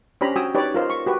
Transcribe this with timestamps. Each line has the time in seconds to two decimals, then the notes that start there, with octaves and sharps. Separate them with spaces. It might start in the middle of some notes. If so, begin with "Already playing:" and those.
0.21 C#4 D4 G4 C5 A#5 B5
0.36 F#4 G5 G#5 D#6 E6
0.55 D#4 G4 B4 C#5 D5
0.75 F4 A#4 C5 D#5
0.90 C#6
1.06 F#4 G4 B4